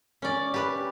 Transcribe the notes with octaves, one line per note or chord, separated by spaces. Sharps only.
C#4 D5
G4 B4